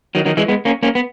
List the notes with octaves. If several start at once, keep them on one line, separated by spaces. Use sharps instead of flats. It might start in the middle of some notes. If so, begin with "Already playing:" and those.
D#3 F#3
D#3 F#3
E3 G#3
G#3 B3
A#3 C#4
A#3 C#4
B3